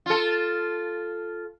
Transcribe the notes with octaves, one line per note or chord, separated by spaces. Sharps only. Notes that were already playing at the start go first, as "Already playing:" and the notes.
F4 A4